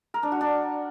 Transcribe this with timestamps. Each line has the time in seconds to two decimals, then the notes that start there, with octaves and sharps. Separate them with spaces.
0.14 A#4
0.23 D4
0.32 F#4
0.41 D4